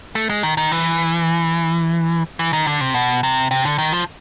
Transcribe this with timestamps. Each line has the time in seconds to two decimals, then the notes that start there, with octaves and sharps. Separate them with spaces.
0.15 A3
0.29 G#3
0.43 D#3
0.57 D#3
0.72 E3
2.39 E3
2.53 D#3
2.67 D3
2.81 C3
2.94 B2
3.23 C3
3.51 C3
3.65 D3
3.78 D#3
3.93 F3